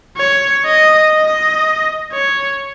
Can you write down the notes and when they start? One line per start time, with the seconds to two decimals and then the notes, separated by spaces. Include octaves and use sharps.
0.17 C#5
0.66 D#5
1.15 D#5
2.12 C#5